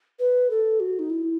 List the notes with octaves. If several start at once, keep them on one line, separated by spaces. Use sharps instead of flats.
B4
A4
F#4
D#4
E4